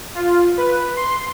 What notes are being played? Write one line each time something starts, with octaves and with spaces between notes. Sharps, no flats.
F4
B4
C6